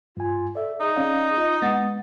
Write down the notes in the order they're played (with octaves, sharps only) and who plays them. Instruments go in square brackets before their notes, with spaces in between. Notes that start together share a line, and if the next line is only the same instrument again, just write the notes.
[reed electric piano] G2 G#5 [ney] F4
[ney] A4 [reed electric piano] D5 E5
[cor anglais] D#4 [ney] G#4
[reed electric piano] C#4 D5 F5
[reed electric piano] F4 [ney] D#5
[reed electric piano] G#3 B3 A6 [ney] F#5